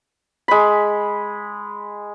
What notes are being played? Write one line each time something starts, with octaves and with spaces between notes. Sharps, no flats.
G#3 B5